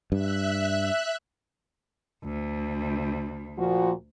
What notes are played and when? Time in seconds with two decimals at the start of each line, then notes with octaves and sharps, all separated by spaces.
0.12 G2 E5 F#6
2.22 D2
3.57 A#2 F3 F#4